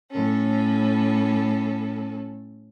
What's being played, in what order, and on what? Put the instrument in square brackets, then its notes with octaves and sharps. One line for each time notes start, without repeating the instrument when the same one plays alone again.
[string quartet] A2 C#4 A4